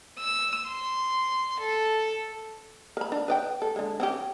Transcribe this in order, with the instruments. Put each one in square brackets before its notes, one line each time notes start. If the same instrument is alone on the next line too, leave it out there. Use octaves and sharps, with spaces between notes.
[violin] E6
C6
A4
[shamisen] A#4 B5
D4
B4 D5 G5
A4
D3 G#3
C4 C#4 G4